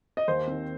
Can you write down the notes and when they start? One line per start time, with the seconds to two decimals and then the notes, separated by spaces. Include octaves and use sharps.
0.17 D#5
0.28 D#2 C5
0.48 D#3 C4